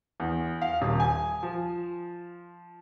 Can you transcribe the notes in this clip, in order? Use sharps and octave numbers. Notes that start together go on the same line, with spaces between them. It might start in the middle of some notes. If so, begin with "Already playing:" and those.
E2
F5
D#1
G#5
F3